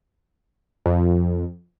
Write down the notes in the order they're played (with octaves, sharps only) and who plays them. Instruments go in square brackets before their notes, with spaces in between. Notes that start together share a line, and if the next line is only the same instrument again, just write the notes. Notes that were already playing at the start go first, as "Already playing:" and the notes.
[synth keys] F2